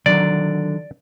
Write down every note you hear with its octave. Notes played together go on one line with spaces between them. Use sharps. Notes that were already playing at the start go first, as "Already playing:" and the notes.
D3 D#3 F#3 D5